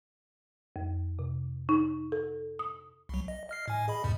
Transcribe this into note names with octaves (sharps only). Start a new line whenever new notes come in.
F2
C3
D#4
A4
D#6
C2 F#3
D#5
D#5 F6 C7
A2 G#5
G#4 D#5 B5
E2 G#2 C3